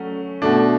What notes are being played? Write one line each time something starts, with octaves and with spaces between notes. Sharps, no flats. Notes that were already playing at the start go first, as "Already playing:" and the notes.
Already playing: F#3 A3 C#4
B2 A3 D4